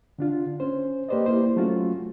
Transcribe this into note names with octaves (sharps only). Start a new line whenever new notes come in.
D3 D4 F4
C#4 C5
A#3 G4 B4 C5 D5 D#5
A#3 E4 C5
F#3 A3 C#4 F4 F#4